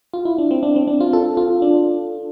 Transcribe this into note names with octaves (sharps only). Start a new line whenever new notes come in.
F4
E4
D4
C4
D4
C4
D4
F4
A4
F4
D4